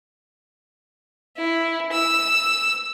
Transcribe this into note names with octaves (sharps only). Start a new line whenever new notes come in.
E4
E6